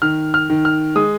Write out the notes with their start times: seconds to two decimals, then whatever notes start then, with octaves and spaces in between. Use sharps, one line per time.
0.02 D#3 F6
0.34 F6
0.50 D#3
0.65 F6
0.96 G#3 D#6